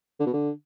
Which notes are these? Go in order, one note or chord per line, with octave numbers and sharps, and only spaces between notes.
D3
B2
D3